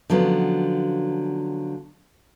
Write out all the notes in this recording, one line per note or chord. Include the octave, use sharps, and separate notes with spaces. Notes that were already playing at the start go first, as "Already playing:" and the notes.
D3 F3 F#3 B3 C#4